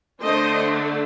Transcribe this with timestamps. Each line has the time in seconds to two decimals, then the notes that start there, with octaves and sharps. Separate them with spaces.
0.21 D3 A3 D4 C5 D#5